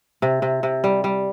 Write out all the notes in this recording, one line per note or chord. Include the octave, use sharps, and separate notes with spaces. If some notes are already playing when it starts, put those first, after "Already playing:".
C3
C3
C3
G3
G3